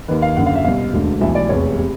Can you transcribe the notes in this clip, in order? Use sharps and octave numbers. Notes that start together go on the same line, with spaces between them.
D#2 D#3 B4
F5
F#1 F#2 D3 F#5
F5
E5
C2 B2 F5
E1 D2 D3
B1 A2 E3 E5
D5
F1 E2 C3 C#5
C3